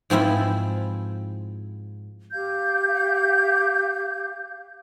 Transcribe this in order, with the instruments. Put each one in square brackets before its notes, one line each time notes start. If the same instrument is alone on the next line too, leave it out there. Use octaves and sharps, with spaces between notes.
[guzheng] G#2 F3 C4 E4 B5
[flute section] G4 F5 G6